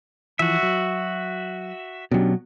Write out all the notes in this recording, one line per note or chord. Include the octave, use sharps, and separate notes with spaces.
E3 F3 F#4 E5
F#3
B2 F#3 C#4 D4 G4